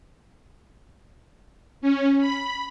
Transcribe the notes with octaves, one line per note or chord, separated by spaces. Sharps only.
C#4
B5